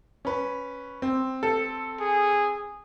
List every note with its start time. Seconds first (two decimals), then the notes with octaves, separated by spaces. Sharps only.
0.25 C#4 B4
1.02 C4
1.43 A4
2.00 G#4